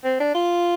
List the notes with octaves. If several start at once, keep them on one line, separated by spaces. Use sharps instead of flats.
C4
D4
F4